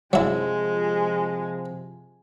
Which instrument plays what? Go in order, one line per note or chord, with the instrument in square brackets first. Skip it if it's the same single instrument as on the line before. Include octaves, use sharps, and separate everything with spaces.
[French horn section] C3 F3 [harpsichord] F#3 E4 [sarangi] G#3